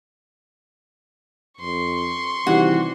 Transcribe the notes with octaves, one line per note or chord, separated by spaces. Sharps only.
F2 C6 C#6
C3 D#3 E3 G3 F#4